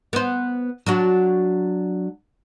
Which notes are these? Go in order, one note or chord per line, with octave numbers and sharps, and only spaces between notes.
B3 C5
F#3 D4 F#4